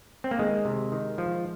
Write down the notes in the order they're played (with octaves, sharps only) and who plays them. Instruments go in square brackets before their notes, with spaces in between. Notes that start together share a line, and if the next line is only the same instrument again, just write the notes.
[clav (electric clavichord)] C4
A#3
D#3 G#3
C3
D#3
F3